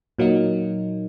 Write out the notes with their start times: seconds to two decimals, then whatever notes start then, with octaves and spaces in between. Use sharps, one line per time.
0.19 A#2 F#3 A#3 D#4